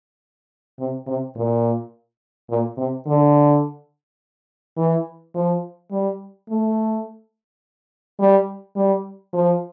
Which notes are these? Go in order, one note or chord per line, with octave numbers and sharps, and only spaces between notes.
C3
C3
A#2
A#2
C3
D3
E3
F3
G3
A3
G3
G3
F3